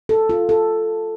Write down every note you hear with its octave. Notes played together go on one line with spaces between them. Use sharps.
A4
F4
A4